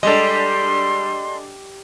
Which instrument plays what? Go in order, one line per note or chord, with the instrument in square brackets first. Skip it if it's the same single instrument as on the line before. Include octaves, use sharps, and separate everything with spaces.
[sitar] G3 [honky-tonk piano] G#3 D4 [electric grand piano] A4 D#5 [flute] C6